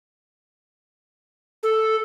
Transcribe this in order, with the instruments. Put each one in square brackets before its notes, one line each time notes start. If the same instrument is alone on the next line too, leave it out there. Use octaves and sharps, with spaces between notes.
[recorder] A4